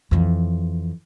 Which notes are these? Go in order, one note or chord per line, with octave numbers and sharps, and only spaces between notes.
F2 E3